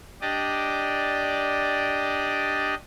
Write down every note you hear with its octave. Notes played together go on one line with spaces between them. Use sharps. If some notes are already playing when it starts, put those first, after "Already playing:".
D4 G4 D5 D#5